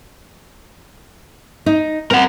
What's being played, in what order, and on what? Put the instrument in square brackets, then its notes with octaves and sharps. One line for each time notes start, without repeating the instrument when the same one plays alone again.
[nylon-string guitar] D#4
[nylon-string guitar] C4 [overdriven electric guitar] A#4 F#5